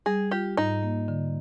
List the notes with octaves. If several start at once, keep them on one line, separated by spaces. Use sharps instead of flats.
G3 G#4
F4 G4
G#2 D#4
A#3
D3